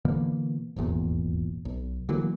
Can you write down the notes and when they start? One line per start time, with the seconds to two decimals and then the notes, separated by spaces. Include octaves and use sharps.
0.05 B2 D3 E3 A#3
0.76 D#1 G#1 E2 A#2
1.65 B1
2.09 D3 E3 F#3 A#3